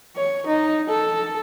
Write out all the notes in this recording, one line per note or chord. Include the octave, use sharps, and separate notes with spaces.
C#5
D#4
A4